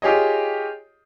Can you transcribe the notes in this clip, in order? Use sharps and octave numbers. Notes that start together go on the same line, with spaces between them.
F4 G4 G#4 C#5 D#5